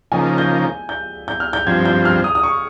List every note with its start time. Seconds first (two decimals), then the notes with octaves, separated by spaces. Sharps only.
0.12 C#3 F3 A#3 D#4 G#5
0.38 G6
0.89 G6
1.28 G6
1.40 F6
1.53 G6
1.67 G2 F3 C4 G#6
1.85 G6
2.05 F6
2.24 D#6
2.35 D#6
2.43 C#6